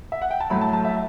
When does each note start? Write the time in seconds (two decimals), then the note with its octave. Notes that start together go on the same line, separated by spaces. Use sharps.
0.12 E5
0.22 F#5
0.31 G5
0.40 A5
0.50 A2 F#3 A3 B5
0.61 A5
0.73 A5
0.85 E5